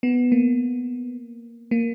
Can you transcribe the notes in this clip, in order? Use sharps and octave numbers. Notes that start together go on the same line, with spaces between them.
B3
A#3
A#3